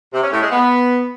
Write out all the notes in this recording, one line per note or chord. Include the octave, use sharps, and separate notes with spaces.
C3
C#4
A2
G#3
B3